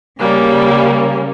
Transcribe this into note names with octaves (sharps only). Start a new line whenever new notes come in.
C#3 G3 A#3 C#4